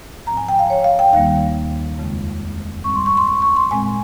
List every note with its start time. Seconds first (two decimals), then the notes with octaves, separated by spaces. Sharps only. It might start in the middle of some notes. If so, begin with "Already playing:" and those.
0.27 G#2 F3 C4 A#5
0.37 G#5
0.49 G5
0.59 F5
0.70 C#5
0.84 F5
0.99 G5
1.13 D#2 D#3 G3 A#3 F5
1.99 F2 C#3 G#3 C4
2.84 G#2 G3 C4 C#6
2.95 C6
3.06 C#6
3.17 C6
3.28 C#6
3.42 C#6
3.56 C6
3.71 A#2 G#3 C4 G#5